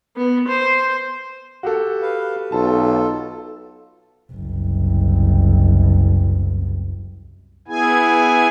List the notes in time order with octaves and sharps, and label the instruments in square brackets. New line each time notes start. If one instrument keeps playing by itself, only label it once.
[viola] B3
C5
[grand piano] F#4 G4 A4
[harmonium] B4 F5
[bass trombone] B1 [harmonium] F4 A4 [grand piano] A5
[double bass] F#1 C2
[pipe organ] B3 E4 G#4 G#5